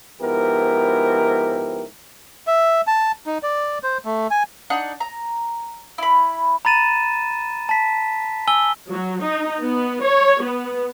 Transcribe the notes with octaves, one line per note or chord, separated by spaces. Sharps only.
G#2 F3 B3 E4 G4 A#4
E5
A5
D#4
D5
C5
A3
G#5
D4 D#4 F#5 F#6
A#5
E4 B5
A#5 B5 A6 D#7 E7
A5 B6
G#5 E6 G7
F#3
D#4
B3
C#5
B3